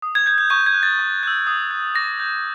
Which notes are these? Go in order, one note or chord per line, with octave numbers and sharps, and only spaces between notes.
D#6
G#6
G6 G#6
G6
C#6 G6
G#6
F#6
A6
C#6
E6 G6
D#6
G6
D6 A#6
G6